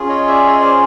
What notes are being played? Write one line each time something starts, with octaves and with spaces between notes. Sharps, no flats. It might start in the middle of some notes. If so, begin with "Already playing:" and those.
Already playing: C#4 F4 G#4
C#5 D#5
D5 E5
C#5 D#5
C5 D5